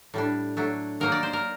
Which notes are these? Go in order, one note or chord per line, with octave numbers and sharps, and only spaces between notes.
A2 G3 D4
F#3 A3 D4
D#3 F#3 A#3 D#4 A#4
D5
C5
A#4